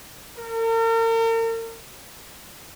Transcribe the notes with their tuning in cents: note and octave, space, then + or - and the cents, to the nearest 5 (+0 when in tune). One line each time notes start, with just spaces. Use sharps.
A#4 -40